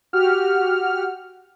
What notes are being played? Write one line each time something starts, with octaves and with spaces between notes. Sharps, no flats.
F#4 G4 F#5 F6